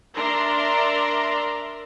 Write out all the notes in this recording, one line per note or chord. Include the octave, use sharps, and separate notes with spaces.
D4 A#4 D5 E5 A#5 C6